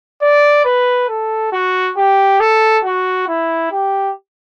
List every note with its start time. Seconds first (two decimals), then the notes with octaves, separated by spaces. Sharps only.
0.22 D5
0.65 B4
1.09 A4
1.53 F#4
1.97 G4
2.40 A4
2.85 F#4
3.29 E4
3.72 G4